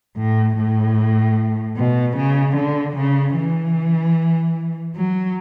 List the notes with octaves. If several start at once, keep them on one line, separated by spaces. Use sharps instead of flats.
A2
A2
B2
C#3
D3
C#3
E3
F#3